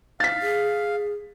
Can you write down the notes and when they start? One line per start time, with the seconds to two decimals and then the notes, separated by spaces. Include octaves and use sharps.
0.20 F5 A6 B6
0.42 G#4